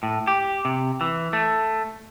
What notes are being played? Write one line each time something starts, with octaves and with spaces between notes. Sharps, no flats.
A2
G4
C3
E3
A3